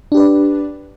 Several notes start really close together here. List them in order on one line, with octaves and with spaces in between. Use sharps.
D4 G4 B4 D5